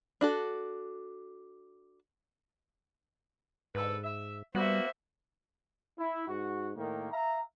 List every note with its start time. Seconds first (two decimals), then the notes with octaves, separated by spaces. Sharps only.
0.21 D4 F#4 A4
3.75 G#2 D3 A4 B4
4.03 E5
4.55 G3 A#3 B3 F#4 C5 E5
5.99 E4
6.28 G#2 F#4
6.76 A2 D#3 A#3
7.12 E5 F5 A#5